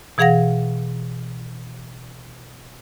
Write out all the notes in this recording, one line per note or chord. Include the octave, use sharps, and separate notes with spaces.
B2 E3 G#4 F5 F#5 A#6